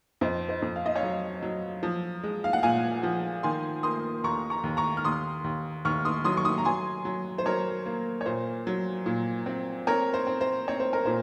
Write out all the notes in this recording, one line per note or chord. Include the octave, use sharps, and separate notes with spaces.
F2 C5 D#5
C5 D#5
F2
F5
D#5
C#5 F5
F#3
F#3
F3
G#3
F5
F#5
A#2 F5 G#5
F3
D#3 G#5 C6
A#3 C6 D#6
D#2 A#5 C#6
A#5 C#6
D#2
A#5 C#6
F6
D#2 C6 D#6
D#2
D#2 C#6 F6
C6 D#6
F#3 C6 D#6
C#6
C6 D#6
A#5
F#3 G#5 C6
F#3
C5
F#3 A#4 C#5
A#3
C#5
A#2 C5
F#3
A#2
C4
C4 A#4 C#5
C5
C4
C5
C4 C#5
C5
A#4
A#2 C5